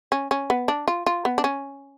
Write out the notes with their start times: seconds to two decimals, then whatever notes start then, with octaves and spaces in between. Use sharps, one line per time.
0.12 C#4
0.31 C#4
0.50 B3
0.68 D4
0.88 F4
1.06 F4
1.25 B3
1.38 D4
1.44 C#4